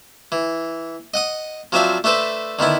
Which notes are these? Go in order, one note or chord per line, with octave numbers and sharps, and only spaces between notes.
E3
D#5 F#5 D#6
F3 F#3 C4 D4 E5 F5
A3 D4 A4 B4 C5
D3 D#3 B3 E4